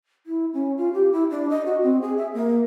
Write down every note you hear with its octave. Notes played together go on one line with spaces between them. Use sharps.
E4
C#4
F4
G4
E4
D4
D#5
F#4
C4
G#4
E5
A#3